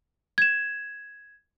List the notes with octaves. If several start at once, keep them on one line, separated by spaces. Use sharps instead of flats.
G#6 E7